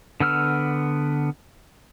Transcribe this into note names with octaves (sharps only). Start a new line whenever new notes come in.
D3 B3 E6 F6